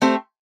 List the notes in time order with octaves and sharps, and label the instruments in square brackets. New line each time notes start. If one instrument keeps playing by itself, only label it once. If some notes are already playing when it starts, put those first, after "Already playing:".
[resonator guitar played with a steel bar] A3 C4 G4 C5